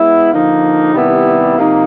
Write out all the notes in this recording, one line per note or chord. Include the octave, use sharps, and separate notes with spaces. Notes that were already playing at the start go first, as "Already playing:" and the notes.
Already playing: G#3 B3 E4
D3 F3 A#3 D#4
C3 D#3 G3 B3 E4
C3 F3 A#3 D#4